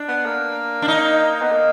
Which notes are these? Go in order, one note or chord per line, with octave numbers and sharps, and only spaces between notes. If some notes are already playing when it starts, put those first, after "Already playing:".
Already playing: D4
B3
A#3
D4
D#4
B3
A#3